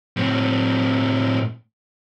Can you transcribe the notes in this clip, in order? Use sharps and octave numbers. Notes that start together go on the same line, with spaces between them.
A2 C4